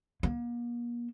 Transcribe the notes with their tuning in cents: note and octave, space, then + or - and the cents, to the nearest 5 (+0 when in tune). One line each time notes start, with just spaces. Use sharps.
A#3 +40